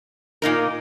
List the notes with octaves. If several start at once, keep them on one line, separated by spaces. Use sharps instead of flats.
A#2 A#3 D#4 A#4